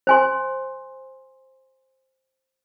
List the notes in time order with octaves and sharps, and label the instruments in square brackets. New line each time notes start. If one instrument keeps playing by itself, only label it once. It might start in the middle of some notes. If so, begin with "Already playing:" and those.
[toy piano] C5 G#5 C6